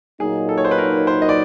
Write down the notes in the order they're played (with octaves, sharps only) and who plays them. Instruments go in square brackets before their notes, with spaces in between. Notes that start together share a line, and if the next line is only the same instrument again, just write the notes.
[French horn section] A#2 F#3 A#3 D#4 [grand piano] G#4
[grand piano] A4
C#5
C5
B4
A#4
C5
D#5
D5